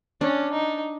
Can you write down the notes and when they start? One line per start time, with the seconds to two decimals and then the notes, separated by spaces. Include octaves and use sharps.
0.21 C#4 D4
0.52 D#4